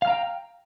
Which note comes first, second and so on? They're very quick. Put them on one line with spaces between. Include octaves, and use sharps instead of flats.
F5 F6 A#5 G5